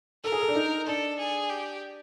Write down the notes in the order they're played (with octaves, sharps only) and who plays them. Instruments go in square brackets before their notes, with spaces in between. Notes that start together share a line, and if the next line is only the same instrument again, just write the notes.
[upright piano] A4 [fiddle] A#4
[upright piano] G#4
A4
D4
D#4
[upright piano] D4 [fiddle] A4
[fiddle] G#4
G4